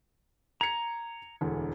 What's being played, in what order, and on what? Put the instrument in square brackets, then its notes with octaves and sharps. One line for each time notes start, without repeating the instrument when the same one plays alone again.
[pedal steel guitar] A#5 [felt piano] G#6 C#7
[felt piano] E1 D2 E3